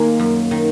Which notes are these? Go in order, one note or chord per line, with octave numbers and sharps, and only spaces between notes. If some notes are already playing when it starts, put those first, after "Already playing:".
Already playing: D#3 G#3 A#3
F#2
D#3